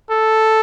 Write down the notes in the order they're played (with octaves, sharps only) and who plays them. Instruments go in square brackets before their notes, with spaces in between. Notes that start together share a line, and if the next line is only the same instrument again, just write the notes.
[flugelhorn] A4